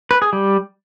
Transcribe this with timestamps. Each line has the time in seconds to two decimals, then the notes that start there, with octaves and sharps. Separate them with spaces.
0.11 B4
0.22 G#4
0.33 G3